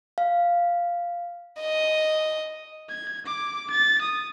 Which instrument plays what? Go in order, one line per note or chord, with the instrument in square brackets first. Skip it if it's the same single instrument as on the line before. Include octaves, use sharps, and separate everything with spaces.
[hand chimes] F5
[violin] D#5
[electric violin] G#6
D6
A6
D#6